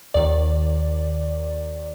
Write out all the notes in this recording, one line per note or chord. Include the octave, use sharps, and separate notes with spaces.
D#2 D#3 D5